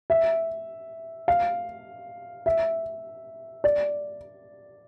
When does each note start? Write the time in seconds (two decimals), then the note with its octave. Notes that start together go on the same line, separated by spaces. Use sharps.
0.10 E5
1.28 F5
2.46 E5
3.64 D5